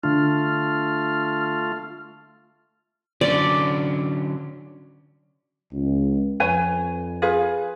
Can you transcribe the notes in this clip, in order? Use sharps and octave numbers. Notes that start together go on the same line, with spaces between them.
D3 A3 D4 F4 F6
D3 F#3 C#4 D5
C#2
F2 B4 C#5 G#5
F4 G#4 B4